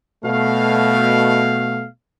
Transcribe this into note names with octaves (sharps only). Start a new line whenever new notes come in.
B2 A3 F5